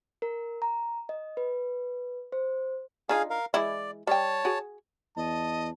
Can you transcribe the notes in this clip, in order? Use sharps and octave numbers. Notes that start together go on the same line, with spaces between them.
A#4
A#5
D#5
B4
C5
D4 D#4 F4 G#4 F5
A#4 F5
E3 G#3 E4 D5
G3 C#5 G5 A5
F#4 G#4
E2 D#5 A5